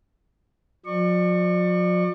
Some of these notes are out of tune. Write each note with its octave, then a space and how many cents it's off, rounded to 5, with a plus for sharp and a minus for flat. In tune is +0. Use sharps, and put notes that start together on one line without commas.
F3 +45 D5 +35 C#6 -5